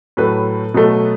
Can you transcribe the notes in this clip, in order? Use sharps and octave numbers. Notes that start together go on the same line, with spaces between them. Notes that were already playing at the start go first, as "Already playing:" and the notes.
A2 F#3 A3 B4
B2 F#3 A3